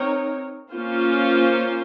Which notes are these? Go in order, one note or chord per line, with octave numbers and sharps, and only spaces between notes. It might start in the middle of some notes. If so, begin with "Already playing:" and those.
Already playing: C4 D#4 A#4 C#5
A#3 C#4 F4 C5